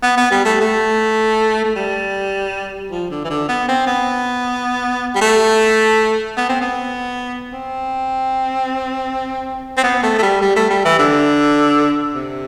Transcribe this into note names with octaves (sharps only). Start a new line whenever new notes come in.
B3
B3
G3
A3
A3
A3
G3
F3
D3
E3
D3
B3
C4
B3
G3
A3
B3
C4
B3
C4
C4
B3
A3
A3
G3
G3
A3
G3
E3
D3
C3